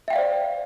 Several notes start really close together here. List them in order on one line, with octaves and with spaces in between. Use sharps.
E5 G5 F5 D5 C5